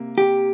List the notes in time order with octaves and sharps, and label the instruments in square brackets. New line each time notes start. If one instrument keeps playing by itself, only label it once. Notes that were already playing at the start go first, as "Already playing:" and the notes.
Already playing: [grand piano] C3 A#3
[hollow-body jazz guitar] G4